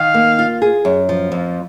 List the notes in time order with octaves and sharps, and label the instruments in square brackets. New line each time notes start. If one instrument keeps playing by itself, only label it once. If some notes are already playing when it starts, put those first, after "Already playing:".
Already playing: [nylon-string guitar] D#3 [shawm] F5
[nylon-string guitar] A#3
F4
G#4
F#2
F3
F2